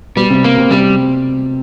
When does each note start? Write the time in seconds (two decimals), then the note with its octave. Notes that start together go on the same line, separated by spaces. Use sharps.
0.16 B2 G3 B3
0.30 C3 C4
0.44 A#3
0.57 C3 C4
0.71 C3 G3 C4